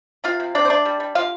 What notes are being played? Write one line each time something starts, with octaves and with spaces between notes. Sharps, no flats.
C3 F4 F5
C3
C3 D4 D5
C5
A3 D4 D5
G3
G3
D3 F4 F5